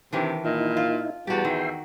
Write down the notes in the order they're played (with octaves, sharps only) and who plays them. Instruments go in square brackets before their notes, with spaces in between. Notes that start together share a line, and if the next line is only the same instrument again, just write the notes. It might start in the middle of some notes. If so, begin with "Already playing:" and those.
[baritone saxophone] C3 [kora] D#3 E3 D4
[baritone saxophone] A#2 [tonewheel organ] D#4 E4
[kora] F4
[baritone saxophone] E2 [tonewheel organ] G3 A5 A6 [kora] F#4 G4
[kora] D#3 [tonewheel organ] E5 G5 C6